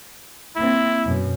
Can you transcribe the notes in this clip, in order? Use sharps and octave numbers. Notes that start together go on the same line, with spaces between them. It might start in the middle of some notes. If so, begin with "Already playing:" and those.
A#3 C4 E4
F#2 B2